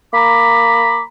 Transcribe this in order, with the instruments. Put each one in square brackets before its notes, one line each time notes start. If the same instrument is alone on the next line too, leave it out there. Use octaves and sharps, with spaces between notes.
[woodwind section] A#3 A#5 B5 D6